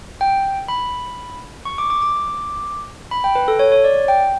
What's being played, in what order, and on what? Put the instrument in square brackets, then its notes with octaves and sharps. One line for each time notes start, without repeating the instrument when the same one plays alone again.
[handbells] G5
B5
C#6
D6
D6
D6
B5
G5
B4
A4
C#5
C#5
D5
G5